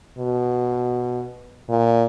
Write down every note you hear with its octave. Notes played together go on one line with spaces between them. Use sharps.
B2
A#2